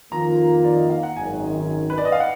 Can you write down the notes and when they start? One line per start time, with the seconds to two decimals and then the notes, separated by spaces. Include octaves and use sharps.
0.12 F2 D#3 A#3 F4 A#5
0.64 D5
0.76 D#5
0.90 F5
1.03 F#5
1.16 G#1 F#2 D#3 G#5
1.90 B4
1.98 D5
2.05 D#5
2.12 F5
2.20 F#5